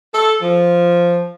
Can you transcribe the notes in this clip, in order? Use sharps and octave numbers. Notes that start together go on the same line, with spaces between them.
A4
F3